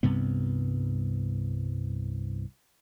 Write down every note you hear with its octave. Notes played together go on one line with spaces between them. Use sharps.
C2 G2 C3 B3